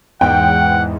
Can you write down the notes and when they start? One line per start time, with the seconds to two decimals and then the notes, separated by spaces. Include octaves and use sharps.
0.21 E2 G#2 F#5 G5